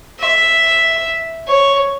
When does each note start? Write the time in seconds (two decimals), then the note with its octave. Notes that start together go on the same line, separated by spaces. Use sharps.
0.20 E5
1.47 C#5